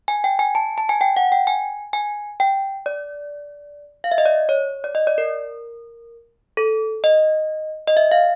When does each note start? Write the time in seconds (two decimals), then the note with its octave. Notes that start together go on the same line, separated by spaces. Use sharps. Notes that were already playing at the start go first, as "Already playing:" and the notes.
0.08 G#5
0.24 G5
0.39 G#5
0.55 A5
0.78 A5
0.89 G#5
1.01 G5
1.17 F#5
1.32 G5
1.47 G#5
1.93 G#5
2.40 G5
2.86 D5
4.04 F5
4.12 E5
4.18 D#5
4.26 D5
4.49 C#5
4.84 D5
4.95 D#5
5.07 D5
5.18 A#4
6.57 A4
7.04 D#5
7.87 D#5
7.97 E5
8.12 F5